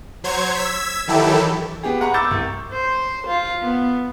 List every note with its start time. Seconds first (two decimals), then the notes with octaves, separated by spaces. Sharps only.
0.24 F#3 C5 C#5 G#6
0.55 E6 G#6 B6
1.07 D#3 E3 F#3 E4 G4 A4
1.83 B3 G4 G#4
2.01 F#5 A#5 B5 C#6
2.14 C#6 D6 E6 G6 A6
2.31 C2
2.72 C5
3.27 F4
3.63 B3